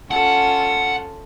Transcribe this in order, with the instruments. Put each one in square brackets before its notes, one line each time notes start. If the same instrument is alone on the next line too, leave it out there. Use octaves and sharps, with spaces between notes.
[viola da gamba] C#4 F4 A4 [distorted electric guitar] F#5